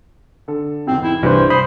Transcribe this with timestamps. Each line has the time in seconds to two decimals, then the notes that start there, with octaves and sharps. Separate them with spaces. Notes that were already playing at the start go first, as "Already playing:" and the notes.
0.48 D3 A4
0.87 E2 G#2 C4
1.03 E4
1.23 C2 G2 E3 E4 C5
1.50 C5 B5 D#6